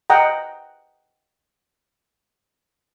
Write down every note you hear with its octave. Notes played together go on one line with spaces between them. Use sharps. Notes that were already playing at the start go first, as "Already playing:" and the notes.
D#5 F#5 G5 A#5